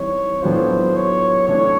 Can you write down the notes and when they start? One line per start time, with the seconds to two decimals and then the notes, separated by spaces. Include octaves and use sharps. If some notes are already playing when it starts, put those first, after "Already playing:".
Already playing: E3 G3 C4 D#4 C#5
0.42 A2 F#3 B3 D4 F4 C5
0.96 C#5
1.48 C3 E3 A3 D4 C#5